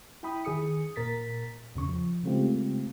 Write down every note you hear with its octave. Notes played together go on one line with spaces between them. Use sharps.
E4 G5 B5 D#6
D#3 G#4 D#6 C#7
A#2 A#4 A6 B6
E2 C#3 C#6
F3
C#3 G#3 A3 C4 F4 G4